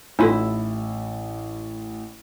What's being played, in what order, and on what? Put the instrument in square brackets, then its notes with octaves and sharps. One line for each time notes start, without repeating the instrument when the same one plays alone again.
[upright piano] A1 [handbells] C#4 F4 A4 [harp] E4